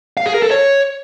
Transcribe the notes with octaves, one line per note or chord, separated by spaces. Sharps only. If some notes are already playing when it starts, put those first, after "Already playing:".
F5
G#4
A#4
A4
C#5